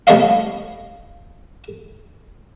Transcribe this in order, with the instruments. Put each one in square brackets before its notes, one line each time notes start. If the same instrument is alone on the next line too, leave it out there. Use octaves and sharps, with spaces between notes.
[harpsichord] C2 A3 B3 C#5 D#5 F5